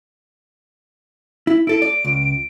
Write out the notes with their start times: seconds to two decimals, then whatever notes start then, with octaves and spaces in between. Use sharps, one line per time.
1.47 E4
1.67 E4 A4 D7
1.82 D5
2.04 C#2